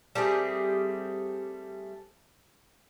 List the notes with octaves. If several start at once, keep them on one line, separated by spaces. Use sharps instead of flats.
G3 A3 C4 G#4